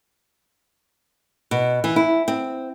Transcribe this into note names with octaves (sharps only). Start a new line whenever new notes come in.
B2
E3
E4
C4